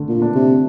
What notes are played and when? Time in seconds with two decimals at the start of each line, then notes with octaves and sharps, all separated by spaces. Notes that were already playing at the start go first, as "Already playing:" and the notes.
Already playing: D3 A3
0.08 A#2
0.22 D4
0.35 C3